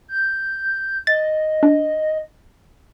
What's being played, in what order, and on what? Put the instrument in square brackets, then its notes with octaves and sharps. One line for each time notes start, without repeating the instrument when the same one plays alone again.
[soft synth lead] G6
[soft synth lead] D#5 [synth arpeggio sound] A6
[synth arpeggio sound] D4